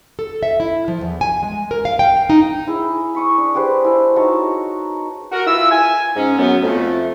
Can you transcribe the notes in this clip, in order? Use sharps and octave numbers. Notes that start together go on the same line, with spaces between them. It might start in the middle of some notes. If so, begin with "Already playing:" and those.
A4
E5
E4
F3
E2
G#5
G#3
A#4
F5
G5
D#4
E4 G#4
B5 C#6 D#6
D4
G4 G#4 B4 C5
E4 G#5
D#4 F#4 C#5 A5
F#4 A#4
E3 E4 F4 E6
G#5
G#2 C#4
F#2 F#3 B3
F2 A3